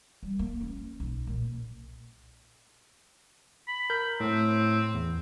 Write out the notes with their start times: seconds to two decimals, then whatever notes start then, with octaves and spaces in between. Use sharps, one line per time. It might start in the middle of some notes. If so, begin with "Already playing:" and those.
0.23 G3
0.39 A#3
0.61 C#4
1.00 B1
1.27 A#2
3.68 B5
3.90 A#4 G6
4.20 A2 C4
4.94 E2